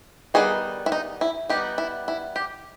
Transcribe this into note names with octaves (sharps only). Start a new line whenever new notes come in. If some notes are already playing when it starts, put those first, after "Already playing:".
D#3 G3 B3 D#4 G#4
E4
D#4
E4
G3 B3 D#4 G4
E4
E4
G4